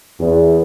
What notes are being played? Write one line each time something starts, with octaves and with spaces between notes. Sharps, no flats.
E2